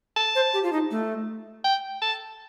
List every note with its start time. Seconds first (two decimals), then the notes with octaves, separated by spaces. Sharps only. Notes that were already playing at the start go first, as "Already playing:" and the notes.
0.16 A5
0.35 C5
0.54 G4
0.63 F4
0.73 D#4
0.91 A3
1.64 G5
2.02 A5